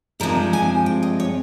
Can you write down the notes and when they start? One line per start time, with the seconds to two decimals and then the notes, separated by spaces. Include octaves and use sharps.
0.20 G2 F3 G#3 C4 A#4
0.53 G#5
0.86 G5
1.03 D#5
1.20 C#5